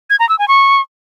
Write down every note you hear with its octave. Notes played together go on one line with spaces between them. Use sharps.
G#6
A#5
E6
G#5
C#6